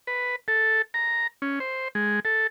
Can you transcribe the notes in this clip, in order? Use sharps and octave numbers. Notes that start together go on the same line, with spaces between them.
B4
A4
A#5
C#4
C5
G#3
A4